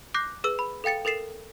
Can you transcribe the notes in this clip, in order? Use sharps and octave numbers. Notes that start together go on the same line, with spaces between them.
D6 F#6 G6 A#6 C7
G#4 B4 E6
B5
A4 F5 G5 A6 C#7
A4 A#4 A6 C7 E7